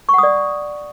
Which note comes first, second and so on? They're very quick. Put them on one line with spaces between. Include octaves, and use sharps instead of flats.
C#6 F#5 D#6 D5